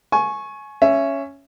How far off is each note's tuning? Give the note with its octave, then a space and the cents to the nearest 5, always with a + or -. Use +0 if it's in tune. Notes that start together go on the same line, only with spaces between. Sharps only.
G#5 +25 C#6 -15
C#4 +0 E5 +20